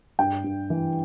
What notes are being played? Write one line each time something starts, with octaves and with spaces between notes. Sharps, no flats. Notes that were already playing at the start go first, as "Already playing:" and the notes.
G2 G5
G2
E3